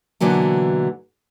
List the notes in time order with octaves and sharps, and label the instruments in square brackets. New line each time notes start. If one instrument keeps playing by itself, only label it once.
[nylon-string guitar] B2 D3 E3 F#3 A#3